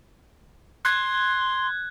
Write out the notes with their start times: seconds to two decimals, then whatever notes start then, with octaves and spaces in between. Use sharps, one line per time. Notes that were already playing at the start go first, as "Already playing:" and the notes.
0.85 C6 F#6 G#6